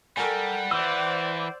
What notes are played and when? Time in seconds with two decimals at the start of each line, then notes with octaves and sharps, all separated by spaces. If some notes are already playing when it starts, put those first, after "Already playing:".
0.17 G3 A4 A#4 F#5 G#5
0.71 E3 C5 D5 E6